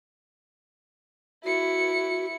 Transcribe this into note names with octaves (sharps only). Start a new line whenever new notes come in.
E4 F#4 C#7